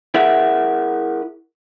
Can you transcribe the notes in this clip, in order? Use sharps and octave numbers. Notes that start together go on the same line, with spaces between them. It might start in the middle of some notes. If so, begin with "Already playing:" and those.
E4 G#4 A#4 E5 F#5